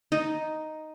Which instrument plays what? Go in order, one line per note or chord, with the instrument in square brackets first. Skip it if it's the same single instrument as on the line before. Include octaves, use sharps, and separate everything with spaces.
[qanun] D#4